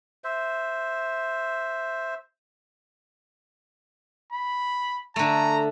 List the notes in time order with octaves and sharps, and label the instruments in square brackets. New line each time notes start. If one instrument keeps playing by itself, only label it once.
[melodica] C5 E5
[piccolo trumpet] B5
[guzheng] D3 A3 [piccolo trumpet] A#5